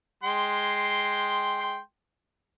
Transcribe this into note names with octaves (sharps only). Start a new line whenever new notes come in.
G#3 G5 C6